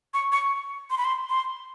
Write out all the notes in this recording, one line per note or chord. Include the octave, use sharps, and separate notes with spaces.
C#6
C#6
C6
B5
C6
C6